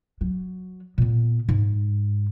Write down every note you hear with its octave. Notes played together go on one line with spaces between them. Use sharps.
F#3
A#2 B3
G#2